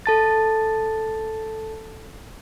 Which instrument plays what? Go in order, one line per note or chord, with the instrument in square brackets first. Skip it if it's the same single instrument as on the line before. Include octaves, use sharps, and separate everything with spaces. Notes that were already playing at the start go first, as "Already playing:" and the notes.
[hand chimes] A4 A5 A6